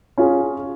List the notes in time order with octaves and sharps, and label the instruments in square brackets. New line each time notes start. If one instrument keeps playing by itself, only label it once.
[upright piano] C#4 F4 G#4